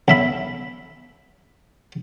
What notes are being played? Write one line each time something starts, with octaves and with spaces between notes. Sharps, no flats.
B1 E5 B5